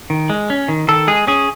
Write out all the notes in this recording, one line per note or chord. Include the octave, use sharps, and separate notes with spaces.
D#3
G#3
C#4
D#3
D#3 A4
G#3 G#4
C#4 G#4